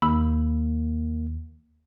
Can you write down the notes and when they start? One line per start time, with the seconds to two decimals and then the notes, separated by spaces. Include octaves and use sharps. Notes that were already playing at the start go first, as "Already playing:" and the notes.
0.02 D#2 A#3 B5 E6